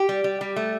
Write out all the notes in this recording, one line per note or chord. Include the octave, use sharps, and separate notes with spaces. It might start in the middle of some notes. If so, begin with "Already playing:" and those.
Already playing: G4
G3
G3
G3
A3